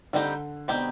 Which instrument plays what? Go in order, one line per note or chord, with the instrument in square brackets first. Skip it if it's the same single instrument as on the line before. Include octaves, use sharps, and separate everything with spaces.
[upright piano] D3 [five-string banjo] G3 C4 D#4 G4
[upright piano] B2 [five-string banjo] G3 C4 D#4 G4